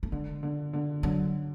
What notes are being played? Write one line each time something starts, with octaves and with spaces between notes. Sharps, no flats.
A3
D3 G#3
D3
D3
D3 F#3